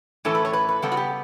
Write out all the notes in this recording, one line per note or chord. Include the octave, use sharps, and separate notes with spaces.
A2 E3 A3 C#4 A4
B4
C#5
B4
B4
C#3 G3 B3 A4
F#4
G4